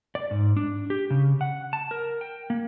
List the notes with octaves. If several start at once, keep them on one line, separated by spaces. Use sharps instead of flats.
D5
G#2
D4
G4
C#3
F#5
A5
A#4
G5
A#3